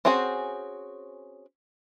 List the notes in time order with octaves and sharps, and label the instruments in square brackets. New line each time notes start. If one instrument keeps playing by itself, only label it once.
[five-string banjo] C4 C#4 F#4 G#4 C5